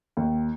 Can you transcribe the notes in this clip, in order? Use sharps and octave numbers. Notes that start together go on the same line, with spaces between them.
D#2